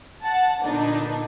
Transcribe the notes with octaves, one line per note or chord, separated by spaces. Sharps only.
F#5 A5
A#2 D3 B3 D4 D#4